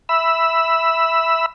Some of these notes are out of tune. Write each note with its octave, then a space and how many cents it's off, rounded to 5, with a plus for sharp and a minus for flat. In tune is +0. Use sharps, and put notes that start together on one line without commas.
E5 +0 B5 +0 E6 +0